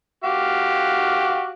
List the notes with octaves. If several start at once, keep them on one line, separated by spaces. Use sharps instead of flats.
F#4 G4 F5